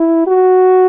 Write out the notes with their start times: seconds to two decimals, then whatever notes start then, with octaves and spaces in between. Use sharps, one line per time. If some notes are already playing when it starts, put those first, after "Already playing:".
Already playing: E4
0.27 F#4